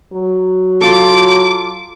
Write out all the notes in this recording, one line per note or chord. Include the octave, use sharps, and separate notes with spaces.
F#3
F4 A4 D6